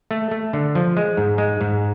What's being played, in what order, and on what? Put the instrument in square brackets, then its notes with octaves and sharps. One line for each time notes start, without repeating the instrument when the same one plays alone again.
[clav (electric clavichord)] A3
A3
D3
F3
G#3
G#2
G#3
G#2